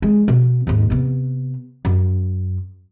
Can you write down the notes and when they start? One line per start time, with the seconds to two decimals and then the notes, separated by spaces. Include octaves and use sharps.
0.02 G#3
0.28 B2
0.67 D#2 G#2
0.90 C3 B3
1.85 F#2